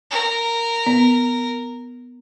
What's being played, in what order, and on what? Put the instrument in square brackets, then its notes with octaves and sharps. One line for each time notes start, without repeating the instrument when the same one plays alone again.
[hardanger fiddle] A#4
[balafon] B3